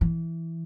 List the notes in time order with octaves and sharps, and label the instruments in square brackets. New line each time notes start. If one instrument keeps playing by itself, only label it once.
[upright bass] E3